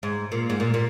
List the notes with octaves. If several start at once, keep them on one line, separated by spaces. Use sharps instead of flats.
G#2
A#2
G#2
A#2
A#2